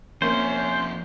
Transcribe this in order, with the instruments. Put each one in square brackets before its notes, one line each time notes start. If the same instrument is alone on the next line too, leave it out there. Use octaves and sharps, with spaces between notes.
[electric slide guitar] F3 C4 E5 [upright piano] A#3 [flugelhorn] C#4 [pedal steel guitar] C5